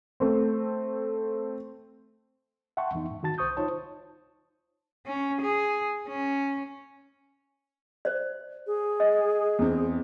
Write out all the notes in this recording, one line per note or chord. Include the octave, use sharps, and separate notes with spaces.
A3 C4
E5 F#5 G5 A5 C6 C#6
F2 E3 B3 D#4
G#2
D#3 F#4 A5 A6
C2 C5 C#6 D#6 G6
D#4 F4 C5 C#5 A5
C#4
G#4
C#4
C5 D5
G#4
D#5
E2 C4